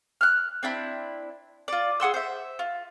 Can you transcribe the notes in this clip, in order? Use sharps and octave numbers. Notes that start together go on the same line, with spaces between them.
F6 F#6
C4 D4 E4 B5
F4 D5
G#4 F#5 C6 E6
C5 E5
F4